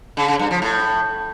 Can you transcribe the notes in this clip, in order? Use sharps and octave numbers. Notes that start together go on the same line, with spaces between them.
C#3
C#3
G2
F3
A2